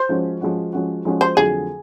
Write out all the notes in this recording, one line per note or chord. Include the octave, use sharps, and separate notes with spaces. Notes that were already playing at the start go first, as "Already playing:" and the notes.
Already playing: C5
F3 G#3 C#4 F#4
F3 G#3 C#4 F#4
F3 G#3 C#4 F#4
F3 G#3 C#4 F#4
C5
F2 D3 F#3 A3 G#4